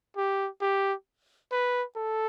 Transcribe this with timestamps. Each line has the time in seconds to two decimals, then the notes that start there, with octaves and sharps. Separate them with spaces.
0.17 G4
0.61 G4
1.52 B4
1.96 A4